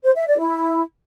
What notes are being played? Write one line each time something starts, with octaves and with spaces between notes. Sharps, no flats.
C5
E5
D5
E4